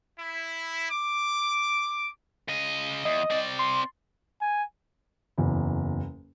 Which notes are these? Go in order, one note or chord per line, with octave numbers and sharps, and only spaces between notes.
E4
D6
C#3 D#5
E2 D#5
C4 D5
C6
G#5
F#1 E2